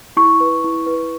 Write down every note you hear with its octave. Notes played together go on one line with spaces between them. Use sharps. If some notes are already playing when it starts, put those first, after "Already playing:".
E4 C#6
B4
E4
B4